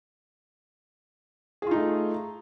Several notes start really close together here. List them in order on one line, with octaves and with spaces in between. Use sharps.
G#4 F4 D#4 A3